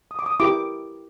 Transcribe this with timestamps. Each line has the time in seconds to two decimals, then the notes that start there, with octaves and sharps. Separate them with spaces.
0.11 D#6
0.19 D6
0.26 D#6
0.40 E4 G4 A#4 D6